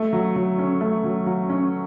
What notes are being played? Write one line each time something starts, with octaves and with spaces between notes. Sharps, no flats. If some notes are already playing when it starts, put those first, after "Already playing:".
Already playing: A3
F#3
F#3
C#4
A3
F#3
F#3
C#4